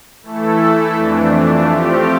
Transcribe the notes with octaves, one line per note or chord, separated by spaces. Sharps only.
E3 A3 E4 A4
F2 E3 A3 D4
F3 A3 C4 G4